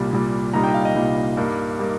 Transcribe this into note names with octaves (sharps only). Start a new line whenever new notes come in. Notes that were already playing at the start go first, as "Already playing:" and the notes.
Already playing: C2 A#2 G3
C2 A#2 G3
C2 A#2 G3 D#4 A#5
G5
F5
D#5
C2 A#2 G3 D#4
G2 G3 A#3 D#4
G3 A#3 D#4